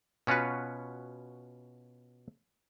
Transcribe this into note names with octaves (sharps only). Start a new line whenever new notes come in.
B2 C#4 F4 F#4 B4